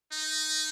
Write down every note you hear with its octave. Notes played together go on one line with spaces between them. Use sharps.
D#4